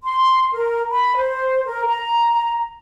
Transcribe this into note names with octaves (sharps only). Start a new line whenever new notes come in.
C6
A#4
B5
C5
A#4
A#5